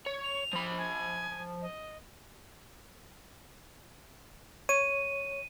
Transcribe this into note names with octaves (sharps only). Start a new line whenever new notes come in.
C#5
F7
F3 B5
G#5
D#5
C#5 D#7